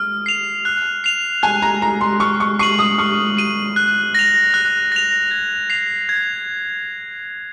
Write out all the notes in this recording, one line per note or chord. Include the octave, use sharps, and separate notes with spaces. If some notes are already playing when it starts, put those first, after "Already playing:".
Already playing: D#6 F6
C7 F7
F#6
C7 F7
G#5 F#6
A#5
A#5 C7 F7
C6
C#6 F6
C#6
C#6 C7 D#7 F#7
D#6
C#6 F6
C7 D#7 F#7
F#6
A#6 F7
F#6
A#6 F7
G#6
C7 F7
G#6